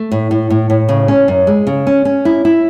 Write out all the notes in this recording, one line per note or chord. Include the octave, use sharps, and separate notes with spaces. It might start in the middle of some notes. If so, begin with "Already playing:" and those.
Already playing: A3
A2
A2
A2
A2
C#3
C#4
F#2
G#3
C#3
C#4
C#4
E4
E4